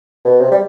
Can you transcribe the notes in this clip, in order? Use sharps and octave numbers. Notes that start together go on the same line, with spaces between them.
B2
C3
G3